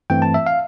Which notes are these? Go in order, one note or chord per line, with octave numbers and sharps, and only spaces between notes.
G2 E3 A3 C4 G5
A5
E5
F5